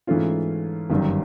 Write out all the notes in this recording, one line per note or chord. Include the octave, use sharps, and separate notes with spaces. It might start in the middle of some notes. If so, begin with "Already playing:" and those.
G#2 E3 A3 C#4 F4
G1 F#2 D#3 G3